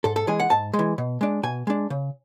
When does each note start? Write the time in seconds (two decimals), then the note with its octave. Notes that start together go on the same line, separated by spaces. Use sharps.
0.04 G#2 A4
0.16 A4
0.27 E3 G#3 G#4
0.40 F#5
0.50 G#2 A5
0.73 G#3
0.79 E3
0.98 B2
1.21 G#3 D4
1.43 B2 G#5
1.67 G#3 D4
1.90 C#3